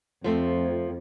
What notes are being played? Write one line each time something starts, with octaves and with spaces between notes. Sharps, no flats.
F2 F3 A3 C4